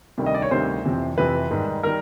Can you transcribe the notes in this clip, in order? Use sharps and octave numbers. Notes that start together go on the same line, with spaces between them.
D2 C3 D#3 G3
D#5
D5
C#5
D2 C3 D#3 G3 C5
F2 C3 E3
F2 C3 E3 B4
G#2 D#3 G3
D#3 G3 A#4